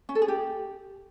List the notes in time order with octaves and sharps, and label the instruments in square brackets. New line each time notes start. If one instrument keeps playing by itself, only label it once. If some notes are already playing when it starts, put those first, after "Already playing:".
[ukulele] C#4
A4
G#4
G4